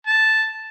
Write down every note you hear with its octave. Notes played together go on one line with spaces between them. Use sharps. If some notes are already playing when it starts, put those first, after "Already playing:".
A5